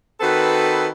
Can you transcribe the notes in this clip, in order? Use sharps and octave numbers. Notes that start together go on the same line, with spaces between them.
D#3 C4 F#4 A4 B4